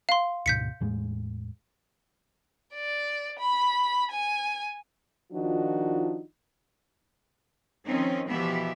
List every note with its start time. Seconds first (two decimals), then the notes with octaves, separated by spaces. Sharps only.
0.09 F5 C6
0.46 D2 G#2 B2 G6 B6 C#7
0.81 E2 A2 G#3
2.75 D5
3.39 B5
4.12 G#5
5.33 D#3 F3 D4 D#4 F4 F#4
7.86 D#3 F3 C4 C#4 D#4
8.29 B2 E3 F3 B3 G4 E5